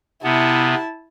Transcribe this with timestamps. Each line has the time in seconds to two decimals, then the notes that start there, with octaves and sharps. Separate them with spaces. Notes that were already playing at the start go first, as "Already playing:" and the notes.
0.24 C3 B3 E4 A5